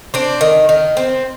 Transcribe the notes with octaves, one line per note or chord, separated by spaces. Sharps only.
C4 D4
D#3
D#3
C4